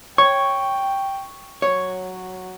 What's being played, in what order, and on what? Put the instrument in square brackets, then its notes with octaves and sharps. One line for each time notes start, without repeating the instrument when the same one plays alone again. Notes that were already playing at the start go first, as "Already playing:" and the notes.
[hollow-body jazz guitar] C#5 [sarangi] G5 [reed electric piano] C#6
[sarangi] F#3 [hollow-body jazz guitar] C#5